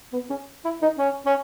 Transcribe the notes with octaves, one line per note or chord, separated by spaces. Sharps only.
B3
C#4
E4
D#4
C#4
C#4